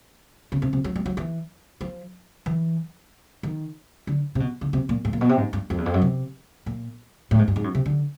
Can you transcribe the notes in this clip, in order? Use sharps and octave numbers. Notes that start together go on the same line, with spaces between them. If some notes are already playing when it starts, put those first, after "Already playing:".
C#3
C3
C3
F#3
G3
F#3
E3
F3
E3
D#3
D3
C3
B2
D3
C3
A#2
A2
A#2
B2
C3
G#2
G2
F2
E2
F2
F#2
C3
A#2
A2
G#2
G2
G#2
F#2
C3
D3